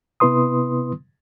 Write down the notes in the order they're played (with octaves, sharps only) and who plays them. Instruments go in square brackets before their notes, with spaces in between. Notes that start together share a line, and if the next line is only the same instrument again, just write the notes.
[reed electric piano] C3 B3 E4 B4 C6 D#6